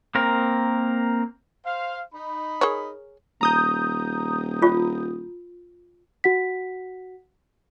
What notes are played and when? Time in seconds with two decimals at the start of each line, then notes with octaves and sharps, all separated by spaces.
0.15 A#3 C4 A#4
1.66 C5 F5
2.14 D#4 B5
2.61 G#4 A#4 C#5
3.41 D#1 A#5 D#6 G6
4.62 F4
6.24 F#4 F#5 B6